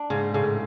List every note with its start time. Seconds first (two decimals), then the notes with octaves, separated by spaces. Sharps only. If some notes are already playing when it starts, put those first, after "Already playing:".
Already playing: D4
0.10 G#2 C#3
0.34 A2 C#3